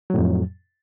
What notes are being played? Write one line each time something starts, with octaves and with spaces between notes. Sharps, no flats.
F2 A2 F#3